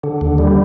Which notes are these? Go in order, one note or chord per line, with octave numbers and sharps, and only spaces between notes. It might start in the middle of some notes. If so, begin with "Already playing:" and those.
D3
D#2
G3